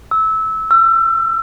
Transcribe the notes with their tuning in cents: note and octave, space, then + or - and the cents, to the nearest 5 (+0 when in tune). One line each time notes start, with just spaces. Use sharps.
E6 -20
E6 +35